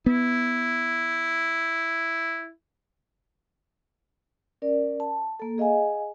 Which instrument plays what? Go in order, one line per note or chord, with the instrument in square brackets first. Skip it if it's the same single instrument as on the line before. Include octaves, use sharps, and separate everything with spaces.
[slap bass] B3 [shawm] E4
[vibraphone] C#4 A#4 D5
A5
A#3 A4
G#4 D#5 F5 G#5